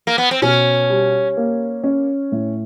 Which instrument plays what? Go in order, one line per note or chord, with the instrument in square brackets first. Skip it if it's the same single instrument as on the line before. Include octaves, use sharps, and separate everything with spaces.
[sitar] A#3
B3
C4
[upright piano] B2 [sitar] C#4
[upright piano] G3
A#3
C#4
A2